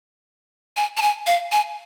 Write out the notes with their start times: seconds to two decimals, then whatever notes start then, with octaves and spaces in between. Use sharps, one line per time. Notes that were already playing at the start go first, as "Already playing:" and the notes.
0.77 G#5
0.97 A5
1.02 G#5
1.27 F5
1.52 G#5